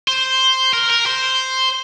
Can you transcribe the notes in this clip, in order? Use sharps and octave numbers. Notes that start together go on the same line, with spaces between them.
C5
A#4
A#4
C5